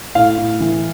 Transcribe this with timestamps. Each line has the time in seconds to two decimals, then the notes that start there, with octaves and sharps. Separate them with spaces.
0.15 A2 F5
0.38 A2
0.60 E3